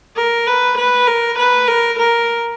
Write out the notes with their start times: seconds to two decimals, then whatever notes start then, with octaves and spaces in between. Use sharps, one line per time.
0.16 A#4
0.47 B4
0.77 B4
1.07 A#4
1.38 B4
1.68 A#4
1.99 A#4